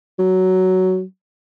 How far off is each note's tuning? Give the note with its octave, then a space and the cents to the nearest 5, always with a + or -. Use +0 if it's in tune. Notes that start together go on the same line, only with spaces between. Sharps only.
F#3 +10